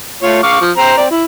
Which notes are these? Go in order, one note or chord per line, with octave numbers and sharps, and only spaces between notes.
A3 F4 C#5
F5 C#6 D6
F3
C4 C5 A#5
C4 D5
E4